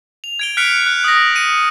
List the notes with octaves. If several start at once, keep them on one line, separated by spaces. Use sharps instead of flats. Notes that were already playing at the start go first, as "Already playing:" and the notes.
F7
G#6 D7 G7
F6 F#6 B6 C#7 D7 F7
F#6
D#6 A#6
C#7 D#7